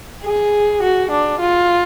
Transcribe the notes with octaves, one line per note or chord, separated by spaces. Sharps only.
G#4
F#4
D4
F4